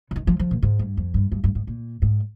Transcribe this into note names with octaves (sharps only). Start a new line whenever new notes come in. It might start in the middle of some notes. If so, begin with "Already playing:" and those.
D3
D#3
F3
F3
A#2
G#2
G2
F2
G2
G2
G2
G#2
A#2
G#2